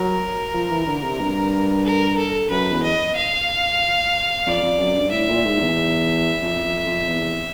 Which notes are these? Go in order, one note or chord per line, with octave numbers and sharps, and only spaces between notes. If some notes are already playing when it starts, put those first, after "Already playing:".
Already playing: F#3 A#4
F3
E3
D3
C3
G2
A#4
A4
F#2 B4
E2
D#5
F5
F2 D5
F2
F#2
G2
A2 E5
A#2
G#2
E2
F2
F2
F2
E2